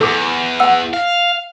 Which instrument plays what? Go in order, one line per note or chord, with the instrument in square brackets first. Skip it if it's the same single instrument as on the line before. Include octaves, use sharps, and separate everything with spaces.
[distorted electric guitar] E2 [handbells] A4 D6
[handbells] F#5 E6
[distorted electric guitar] F5